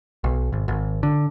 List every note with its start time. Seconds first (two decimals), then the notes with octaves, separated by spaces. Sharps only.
0.24 B1
0.53 G#1
0.68 G#1
1.03 D3